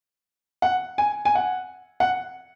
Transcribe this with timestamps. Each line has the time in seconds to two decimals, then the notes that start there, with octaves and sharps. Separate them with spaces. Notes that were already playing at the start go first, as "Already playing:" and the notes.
0.62 F#5
0.98 G#5
1.25 G#5
1.35 F#5
2.00 F#5